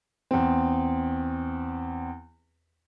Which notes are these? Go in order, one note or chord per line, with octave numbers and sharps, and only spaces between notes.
E2 C4